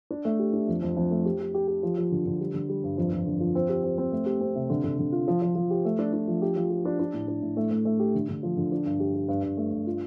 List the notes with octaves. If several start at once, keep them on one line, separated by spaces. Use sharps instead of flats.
D4
A3
G4
D4
F2
F2
F2
A3
G4
G4
G4
G4
F3
F3
D3
D3
G3
D3
G3
G2
F2
F2
D3
F3
C4
G4
C4
C4
A3
G4
C4
C3
D3
D3
D3
F4
F3
F3
F3
G4
A3
D4
D4
F3
G4
F3
G4
D4
D4
A2
D4
A2
A3
A3
A3
G4
D3
D3
F3
D3
D4
G2
G4
G4
G2
G2
A3
G2
F4